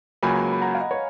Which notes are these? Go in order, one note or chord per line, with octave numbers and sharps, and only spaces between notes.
C#2 C#3 F#3 A#3 G#5 B5
B5
F#5 A#5
F5
D#5 F#5
C#5